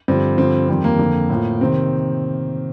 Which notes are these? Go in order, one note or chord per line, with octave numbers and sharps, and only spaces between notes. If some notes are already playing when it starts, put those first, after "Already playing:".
G2 D3 F3 C4
G2 D3 F3 C4
F2 D#3 G3 C4
A#3
F2 D3 F3
A2 F3
C3 D#3 C4